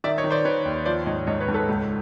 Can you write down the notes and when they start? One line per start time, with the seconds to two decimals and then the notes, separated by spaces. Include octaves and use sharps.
0.04 D#3 D5 E5
0.18 C#5 D#5
0.24 D#3
0.31 C5 D5
0.45 D#3 B4 C#5
0.65 D#2
0.85 F3 C5 D5
1.06 G#2 C#5 D#5
1.27 G#2 C#5 D#5
1.40 B4 C#5
1.48 G#2
1.54 A4 B4
1.69 C#2